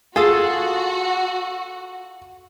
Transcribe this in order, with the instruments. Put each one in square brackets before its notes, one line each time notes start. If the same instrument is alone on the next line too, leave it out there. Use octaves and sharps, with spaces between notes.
[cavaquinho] F4 A4 [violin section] F#4 [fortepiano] G#4